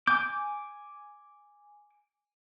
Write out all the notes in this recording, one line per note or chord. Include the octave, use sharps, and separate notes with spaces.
G#5 D6 G6